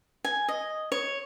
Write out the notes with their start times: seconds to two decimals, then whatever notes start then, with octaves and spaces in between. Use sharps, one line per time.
0.25 G#5
0.48 D#5
0.92 C#5